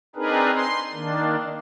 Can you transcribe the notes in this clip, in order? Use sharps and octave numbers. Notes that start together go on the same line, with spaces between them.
C4 D4 D#4 G#4 A#4 B4
C6
D#3 A#3 D4